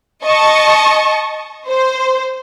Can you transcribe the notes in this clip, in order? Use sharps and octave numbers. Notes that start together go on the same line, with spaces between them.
D#5 A5 C#6
C5